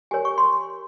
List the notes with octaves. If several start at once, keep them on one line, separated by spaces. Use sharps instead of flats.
G4 A#4 C#5 G#5
C#6
C6